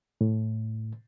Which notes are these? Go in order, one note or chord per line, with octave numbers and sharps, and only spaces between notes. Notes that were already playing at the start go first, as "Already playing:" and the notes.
A2